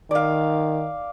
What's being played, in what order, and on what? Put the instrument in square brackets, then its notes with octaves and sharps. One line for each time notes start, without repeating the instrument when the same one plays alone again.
[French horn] D#3 [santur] D5 F5